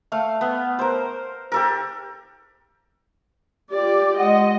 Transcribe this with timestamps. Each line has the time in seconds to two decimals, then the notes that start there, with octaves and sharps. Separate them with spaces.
0.12 A3 F5
0.41 B3
0.79 A#4 C5
1.52 G4 A4 A#4
3.71 F4 G4 D5
4.19 G#3 D#5 F#5